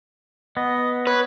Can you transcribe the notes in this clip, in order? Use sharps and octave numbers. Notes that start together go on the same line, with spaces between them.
B3 D#5
B4 C#5